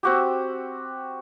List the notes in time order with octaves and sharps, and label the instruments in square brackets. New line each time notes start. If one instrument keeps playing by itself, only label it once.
[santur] C4 F#4 G4